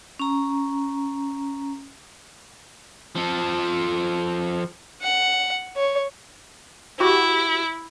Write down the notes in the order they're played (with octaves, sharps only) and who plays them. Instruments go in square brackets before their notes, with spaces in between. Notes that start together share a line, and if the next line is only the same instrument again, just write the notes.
[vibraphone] C#4 A#5
[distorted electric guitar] F3 A4
[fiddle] F#5
C#5
[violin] E4 [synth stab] F#4 G4